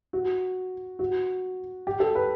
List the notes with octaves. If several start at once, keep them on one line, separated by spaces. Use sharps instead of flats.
F#4
F#4
G4
A4
B4